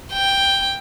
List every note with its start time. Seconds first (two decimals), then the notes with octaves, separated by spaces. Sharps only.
0.13 G5